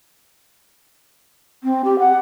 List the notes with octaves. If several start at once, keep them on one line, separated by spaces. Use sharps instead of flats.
C4
G4
F#5